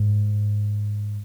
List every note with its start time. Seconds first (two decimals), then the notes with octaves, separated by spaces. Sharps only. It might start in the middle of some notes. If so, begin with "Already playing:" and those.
Already playing: G#2